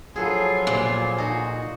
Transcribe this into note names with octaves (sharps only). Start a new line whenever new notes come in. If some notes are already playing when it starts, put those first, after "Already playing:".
F3 F#3 F4 G#4 A4 B4 G#5
A#2
D#4 F#4